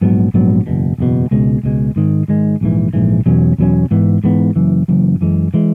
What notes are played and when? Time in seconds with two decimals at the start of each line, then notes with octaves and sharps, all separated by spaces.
0.01 A#1 G#2 F#3 B3
0.34 A#1 G#2 F#3 B3
0.67 F#1 E2 B2
0.98 F#1 E2 B2
1.31 C#2 B2 G#3
1.63 C#2 B2 G#3
1.96 G#2 D#3 G#3
2.28 G#2 D#3 G#3
2.61 A#1 G#2 E3
2.93 A#1 G#2 E3
3.26 E2 B2 F#3 C#4
3.58 E2 B2 F#3 C#4
3.91 G#2 E3 B3
4.24 G#2 E3 B3
4.56 F#1 F#2 E3
4.88 F#1 F#2 E3
5.21 F#2 E3 G#3
5.54 E3 G#3